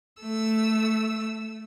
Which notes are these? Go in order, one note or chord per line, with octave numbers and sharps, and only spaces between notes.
A3 E6